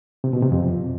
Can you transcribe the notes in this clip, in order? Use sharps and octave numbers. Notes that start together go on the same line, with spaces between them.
C3
B2
C3
F2